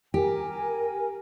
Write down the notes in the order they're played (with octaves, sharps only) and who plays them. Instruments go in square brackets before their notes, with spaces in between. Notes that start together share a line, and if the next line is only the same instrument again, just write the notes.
[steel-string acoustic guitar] G4 [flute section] A#4 G#5